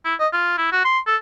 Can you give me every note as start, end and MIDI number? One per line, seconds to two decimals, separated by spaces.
0.05 0.14 64
0.20 0.27 75
0.33 0.57 65
0.58 0.71 64
0.72 0.80 66
0.84 0.99 84
1.07 1.16 69